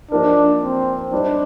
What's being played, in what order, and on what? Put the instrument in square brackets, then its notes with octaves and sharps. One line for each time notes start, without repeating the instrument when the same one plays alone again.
[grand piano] F3 A#3 D#4 G4 A#4 [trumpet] D4
[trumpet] C4
[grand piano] G3 C4 D#4 [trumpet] D4